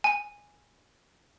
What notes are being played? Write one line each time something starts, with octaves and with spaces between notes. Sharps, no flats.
G#5